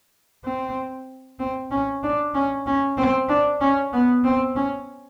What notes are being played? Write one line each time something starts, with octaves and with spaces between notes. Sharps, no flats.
C4
C4
C#4
D4
C#4
C#4
C4
D4
C#4
B3
C4
C#4